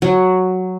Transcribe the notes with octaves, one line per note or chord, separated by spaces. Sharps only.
F#3